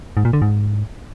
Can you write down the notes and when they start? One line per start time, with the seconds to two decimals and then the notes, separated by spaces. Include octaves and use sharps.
0.17 G#2
0.25 A#2
0.33 D3
0.42 G#2